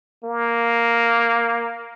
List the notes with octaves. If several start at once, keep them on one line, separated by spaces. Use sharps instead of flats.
A#3